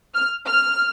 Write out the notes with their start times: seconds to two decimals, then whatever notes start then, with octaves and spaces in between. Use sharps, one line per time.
0.14 F6
0.47 F6